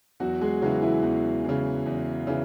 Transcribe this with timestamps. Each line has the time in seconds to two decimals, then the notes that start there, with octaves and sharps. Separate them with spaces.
0.20 E2 F#3 F#4
0.41 G#3 G#4
0.62 C#3 E3 F#3 F#4
0.82 E3 E4
1.03 E2
1.44 C#3 E3
1.86 E2
2.27 C#3 E3